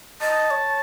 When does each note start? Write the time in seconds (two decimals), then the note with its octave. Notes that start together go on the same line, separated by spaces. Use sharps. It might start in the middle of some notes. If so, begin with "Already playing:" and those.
0.21 D#5 A5
0.51 C#5